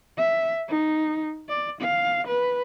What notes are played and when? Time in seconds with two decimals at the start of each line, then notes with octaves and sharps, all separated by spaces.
0.18 E5
0.68 D#4
1.49 D5
1.81 F5
2.27 B4